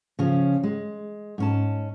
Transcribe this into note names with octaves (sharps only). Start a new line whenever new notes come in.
C#3 F3 C#4
G#3
G#2 C#4 A5